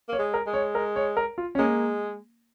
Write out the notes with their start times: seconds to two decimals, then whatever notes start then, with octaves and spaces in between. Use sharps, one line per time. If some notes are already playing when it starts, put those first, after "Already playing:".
0.09 A#3 C#5
0.19 G#3
0.34 A#4
0.47 G#3
0.54 C#5
0.75 A#4
0.96 C#5
1.17 A#4
1.38 F4
1.55 C#4
1.59 G#3 A#3